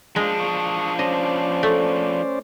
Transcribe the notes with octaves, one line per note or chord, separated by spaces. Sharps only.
F3 G#3 D4
C#6 D#6
C#4 C5 D5 D#5
A3